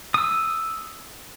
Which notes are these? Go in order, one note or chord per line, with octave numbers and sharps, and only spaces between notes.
D#6 E6